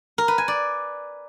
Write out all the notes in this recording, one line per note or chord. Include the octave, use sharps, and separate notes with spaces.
A#4
B4
G#5
D5